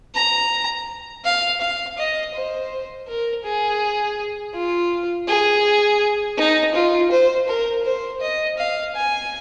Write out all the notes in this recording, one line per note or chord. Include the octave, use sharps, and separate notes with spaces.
A#5
F5
F5
D#5
C5
A#4
G#4
F4
G#4
D#4
F4
C5
A#4
C5
D#5
F5
G#5